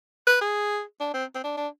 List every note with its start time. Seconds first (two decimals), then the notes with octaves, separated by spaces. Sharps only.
0.27 B4
0.41 G#4
1.00 D4
1.14 C4
1.35 C4
1.44 D4
1.57 D4